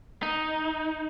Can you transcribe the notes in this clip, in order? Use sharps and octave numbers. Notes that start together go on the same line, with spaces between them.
D#4